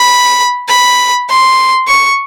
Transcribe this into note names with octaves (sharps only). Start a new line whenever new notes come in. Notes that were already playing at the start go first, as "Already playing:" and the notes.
Already playing: B5
B5
C6
C#6